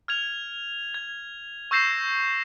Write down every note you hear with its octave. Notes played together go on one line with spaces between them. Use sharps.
F6 G#6 F7
G#6
C#6 E6 G6 A#6 C7 E7